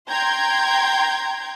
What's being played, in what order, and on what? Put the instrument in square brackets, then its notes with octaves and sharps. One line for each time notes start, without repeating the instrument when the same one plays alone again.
[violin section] G5 A#5 C6 G6 G#6